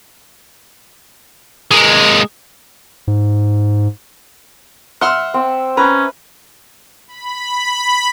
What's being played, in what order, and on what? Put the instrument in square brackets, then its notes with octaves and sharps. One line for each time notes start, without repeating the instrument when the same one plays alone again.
[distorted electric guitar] G#3 A#3
[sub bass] G#2
[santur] E5 [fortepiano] F#5 C6 F6
[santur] C4
[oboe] C#4 [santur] B4 [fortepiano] A#5
[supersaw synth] B5